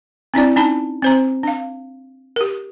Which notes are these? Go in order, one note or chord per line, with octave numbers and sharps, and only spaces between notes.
C4 D4 E4 D5
C#4 D#4 A5 B5
C4 C5 A#5
D4 F5
G4 A#4